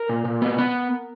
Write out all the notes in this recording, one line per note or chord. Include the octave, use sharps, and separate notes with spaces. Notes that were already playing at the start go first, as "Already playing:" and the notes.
Already playing: A#4
A#2
A#2
B3
B3